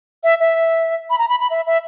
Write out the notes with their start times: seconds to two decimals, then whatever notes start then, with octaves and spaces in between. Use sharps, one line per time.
0.23 E5
0.40 E5
1.10 B5
1.18 A#5
1.29 B5
1.40 B5
1.50 E5
1.66 E5